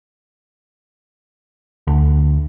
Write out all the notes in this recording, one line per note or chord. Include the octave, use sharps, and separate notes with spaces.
D2